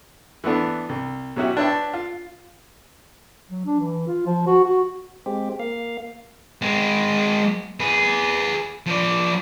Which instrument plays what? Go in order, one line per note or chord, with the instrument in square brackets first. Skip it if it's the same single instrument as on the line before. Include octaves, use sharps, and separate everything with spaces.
[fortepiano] E3 A3 B3 D4
C2
B2 F#3 C#4 E4 F#4 G4
D4 B4 C#5 E5 G5 A5
F4
[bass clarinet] F#3
D4
E3
F4
F3
F#4
F#4
[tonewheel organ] G#3 C4 G4
A#3 F5
[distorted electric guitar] G#3 C4
G#4 B4
F3 D5